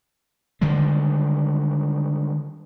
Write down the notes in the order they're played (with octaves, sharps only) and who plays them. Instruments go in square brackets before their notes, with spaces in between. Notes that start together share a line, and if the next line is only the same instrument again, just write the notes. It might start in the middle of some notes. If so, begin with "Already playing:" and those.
[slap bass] D3 D#3 G3 G#3